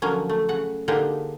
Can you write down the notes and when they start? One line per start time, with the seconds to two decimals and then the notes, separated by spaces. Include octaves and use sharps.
0.02 D3 F3 F#3 A#3 C#4
0.29 A3
0.49 C#3 F#5
0.88 D3 A#3 D4 D#4 G4 G#4